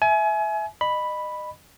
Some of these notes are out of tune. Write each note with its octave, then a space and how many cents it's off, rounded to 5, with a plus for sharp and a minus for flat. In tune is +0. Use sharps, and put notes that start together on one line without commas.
E5 +0 G#5 +30
D#5 -30 B5 +0